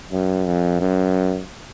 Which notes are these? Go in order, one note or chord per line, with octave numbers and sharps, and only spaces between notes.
F#2
F2
F#2